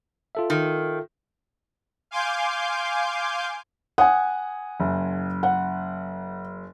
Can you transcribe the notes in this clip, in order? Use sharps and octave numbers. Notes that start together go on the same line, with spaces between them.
F4 A4 E5
D#3
F5 G#5 C6 D6 G6
F#5 G#5 D#6
F#1
F#5